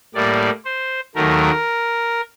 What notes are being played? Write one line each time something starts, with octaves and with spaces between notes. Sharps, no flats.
A2 G3 A#3 D5
C5
D#2 D#3 F#3 A3 A#4